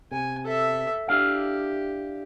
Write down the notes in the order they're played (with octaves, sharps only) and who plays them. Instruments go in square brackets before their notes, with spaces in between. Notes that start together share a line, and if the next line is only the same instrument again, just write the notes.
[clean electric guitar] C3 [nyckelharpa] G#5
[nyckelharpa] A4 E5
[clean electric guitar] D4 E4 F5 [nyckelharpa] G4